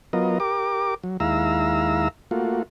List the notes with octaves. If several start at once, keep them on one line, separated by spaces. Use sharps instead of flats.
F#3 B3 F4 A#4 D#5
G4 A#4 D6
F#3
D#2 G#3 E4 F5 A#5 E6
A3 A#3 F4 F#4